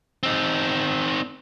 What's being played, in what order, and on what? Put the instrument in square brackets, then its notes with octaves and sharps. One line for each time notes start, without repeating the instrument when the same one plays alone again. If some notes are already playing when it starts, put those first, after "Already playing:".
[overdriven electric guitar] C4 D#4